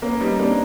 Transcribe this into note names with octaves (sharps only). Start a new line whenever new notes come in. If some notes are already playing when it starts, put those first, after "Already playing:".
A#3 B3 C#4
G3 C#4 D#4
A#3 C4 D4